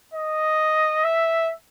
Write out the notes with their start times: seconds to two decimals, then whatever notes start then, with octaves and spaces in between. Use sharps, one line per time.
0.14 D#5
1.04 E5